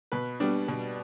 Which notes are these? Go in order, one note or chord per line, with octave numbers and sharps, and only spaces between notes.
B2 B4
G3 B3 D4
B2